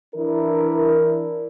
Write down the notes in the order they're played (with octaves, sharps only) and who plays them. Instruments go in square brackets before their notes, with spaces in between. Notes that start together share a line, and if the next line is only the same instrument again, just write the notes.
[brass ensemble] E3 D4 E4 A#4